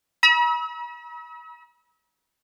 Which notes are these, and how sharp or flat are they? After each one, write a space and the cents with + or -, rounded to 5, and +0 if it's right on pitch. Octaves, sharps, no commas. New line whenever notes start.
B5 -45 E6 -40